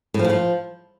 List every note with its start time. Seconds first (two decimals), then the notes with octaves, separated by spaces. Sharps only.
0.14 A2
0.19 F3
0.24 A2
0.30 F3